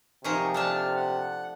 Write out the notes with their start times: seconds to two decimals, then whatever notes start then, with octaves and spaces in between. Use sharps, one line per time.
0.24 C3 F3 D#4 G#4 A#4 C#6
0.54 A3 D4 A5 F6
0.97 F#5